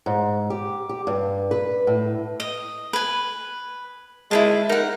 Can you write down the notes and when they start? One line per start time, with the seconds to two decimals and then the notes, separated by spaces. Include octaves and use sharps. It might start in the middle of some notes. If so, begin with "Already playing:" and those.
0.06 G#2
0.50 G4
0.89 G4
1.07 G2
1.51 B4
1.87 A2
2.40 D#5
2.93 B4 G#5
4.31 G#3 E4 G#4 A5
4.69 D#4 A#4 F#5